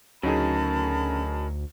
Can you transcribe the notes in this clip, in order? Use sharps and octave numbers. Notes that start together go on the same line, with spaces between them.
D2 C#3 F#3 D#4 G#4 A#4 A5 B5